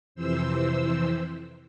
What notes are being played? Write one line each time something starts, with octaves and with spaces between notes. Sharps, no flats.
F2 C3 E3 C5 E6